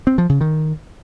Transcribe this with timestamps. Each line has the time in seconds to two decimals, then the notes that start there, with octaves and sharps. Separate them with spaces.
0.07 C4
0.18 F3
0.29 C#3
0.41 D#3